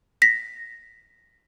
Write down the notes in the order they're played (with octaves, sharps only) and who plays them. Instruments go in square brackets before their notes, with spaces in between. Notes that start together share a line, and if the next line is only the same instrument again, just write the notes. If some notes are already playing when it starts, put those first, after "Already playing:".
[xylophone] A#6 B6